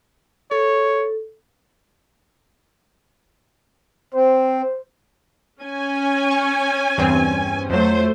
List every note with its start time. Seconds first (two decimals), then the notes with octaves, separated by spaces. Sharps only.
0.51 A4 C#5
4.14 C4 C5
5.61 C#4 G#5
6.31 C#6
6.98 E2 G2 C4
7.70 F2 F#3 A3 C5